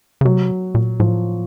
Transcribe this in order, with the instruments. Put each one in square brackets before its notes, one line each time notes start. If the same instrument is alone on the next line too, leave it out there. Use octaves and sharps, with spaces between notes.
[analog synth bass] C#3
[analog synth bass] C3 [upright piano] F#3
[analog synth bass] A#2
[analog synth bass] A2 [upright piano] F3